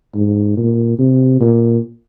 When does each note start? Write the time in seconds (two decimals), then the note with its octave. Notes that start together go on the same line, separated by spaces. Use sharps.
0.15 G#2
0.57 A#2
0.99 C3
1.41 A#2